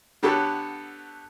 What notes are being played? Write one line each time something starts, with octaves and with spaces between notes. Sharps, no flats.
D3 B3 G4 A4 B4 C#5